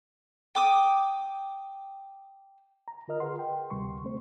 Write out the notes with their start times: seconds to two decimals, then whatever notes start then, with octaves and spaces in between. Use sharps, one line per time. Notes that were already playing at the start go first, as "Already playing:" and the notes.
0.55 G5 D6 D#6
2.88 A#5
3.08 D3 F4 A#4 D#5 F6
3.20 G#4 B4 F#5 C6
3.39 G5
3.70 D2 C3 G3 C6 C#6
4.04 A3 C4 C5